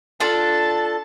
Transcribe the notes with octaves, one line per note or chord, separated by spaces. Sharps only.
D4 F4 A4 A5